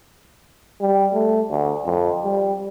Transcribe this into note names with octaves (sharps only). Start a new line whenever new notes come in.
G3
A3
D2
F2
G3